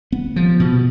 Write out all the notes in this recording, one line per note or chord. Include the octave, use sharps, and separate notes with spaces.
B3
F3
B2